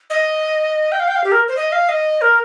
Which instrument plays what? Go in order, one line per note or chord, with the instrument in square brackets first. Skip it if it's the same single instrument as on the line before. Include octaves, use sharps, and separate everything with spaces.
[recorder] D#5
G5
F5
G5
F5
G4
A#4
C5
D#5
F5
D#5
A#4